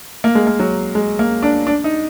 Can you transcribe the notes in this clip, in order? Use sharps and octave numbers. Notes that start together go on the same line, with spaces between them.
A#3
G#3
A#3
F#3
G#3
A#3
D4
D4
D#4